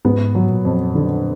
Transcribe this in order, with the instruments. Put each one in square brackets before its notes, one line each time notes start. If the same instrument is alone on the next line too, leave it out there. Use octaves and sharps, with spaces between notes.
[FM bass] G#2 [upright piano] B3
[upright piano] F#3
[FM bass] A#2
[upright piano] F2
D3